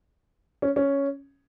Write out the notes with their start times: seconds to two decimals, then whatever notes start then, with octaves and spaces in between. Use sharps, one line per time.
0.62 C#4
0.76 C#4